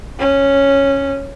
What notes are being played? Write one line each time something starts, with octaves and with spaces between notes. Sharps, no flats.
C#4